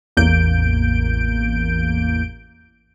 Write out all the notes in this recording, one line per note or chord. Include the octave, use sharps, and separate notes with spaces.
A1 E2 A#3 G6 D7